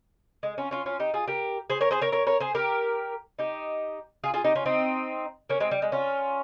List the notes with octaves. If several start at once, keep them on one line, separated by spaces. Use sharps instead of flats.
G#3
C#4 F4
C#4 F4
C#4 F4
D#4 G4
F4 G#4
G4 A#4
G#4 C5
A#4 C#5
G#4 C5
A#4 C#5
A#4 C#5
A#4 C#5
G#4 C5
G4 A#4
D#4 G4
F4 G#4
F4 G#4
D#4 G4
C#4 F4
C4 D#4
A#3 C#4
G#3 C4
G3
G#3
C#4 F4